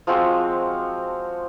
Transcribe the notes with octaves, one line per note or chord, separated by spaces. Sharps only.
F3 G#3 C4 F#4